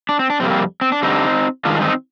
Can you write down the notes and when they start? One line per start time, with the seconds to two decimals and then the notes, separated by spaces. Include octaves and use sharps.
0.09 D4
0.19 C4
0.30 D4
0.40 F2 C3 G3 A#3 C4
0.50 C4
0.81 C4
0.92 D4
1.03 G2 D3 G3 C4 D#4
1.65 G2 D#3 G#3 D4 F4
1.76 D4
1.81 C4 D#4